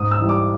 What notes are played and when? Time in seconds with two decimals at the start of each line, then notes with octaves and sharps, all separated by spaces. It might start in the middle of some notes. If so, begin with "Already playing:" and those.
Already playing: G#2 D#6
0.11 E6
0.20 E3 G3
0.29 D6